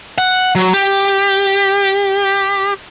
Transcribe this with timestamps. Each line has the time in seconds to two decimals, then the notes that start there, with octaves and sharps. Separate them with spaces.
0.18 F#5
0.55 F#3
0.74 G4